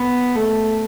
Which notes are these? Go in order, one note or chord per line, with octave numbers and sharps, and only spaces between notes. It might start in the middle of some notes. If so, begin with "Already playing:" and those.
Already playing: B3
A3